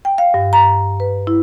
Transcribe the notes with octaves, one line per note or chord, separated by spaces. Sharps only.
G5
F5
G2
A#5
B4
E4